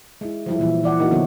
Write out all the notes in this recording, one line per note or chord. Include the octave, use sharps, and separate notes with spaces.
G#3 E4
F3 G3 E4
A#2 E3
E3 D5 F#5
A#3 D#4 E4 F#4
D3 F3 F#3 B3 C#4 C#5